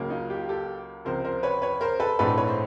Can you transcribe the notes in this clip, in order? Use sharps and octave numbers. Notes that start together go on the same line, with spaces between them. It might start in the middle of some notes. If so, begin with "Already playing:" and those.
Already playing: C#2 C#3 F#3 A#3
D#4 F4
F4 G4
G4 A4
C#2 C3 F3 A#4 C5
A#4 C5
B4 C#5
B4 C#5
A#4 C5
A4 B4
A#1 G#2 E3 A3 C4 A4 B4
B4 C#5
C5